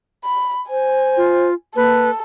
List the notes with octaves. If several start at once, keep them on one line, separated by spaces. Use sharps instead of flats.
B5
C5 G#5
F4
A#3 A4 B4